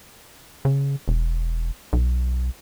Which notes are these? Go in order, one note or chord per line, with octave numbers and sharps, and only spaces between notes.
C#3
E1
B1